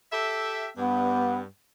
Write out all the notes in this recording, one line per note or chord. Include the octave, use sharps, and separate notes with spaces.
G4 A4 E5
G2 B3